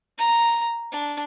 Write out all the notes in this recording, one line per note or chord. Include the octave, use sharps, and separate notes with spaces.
A#5
D4